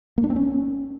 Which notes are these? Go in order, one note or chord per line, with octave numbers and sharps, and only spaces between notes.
A#3
D4
C4
C#4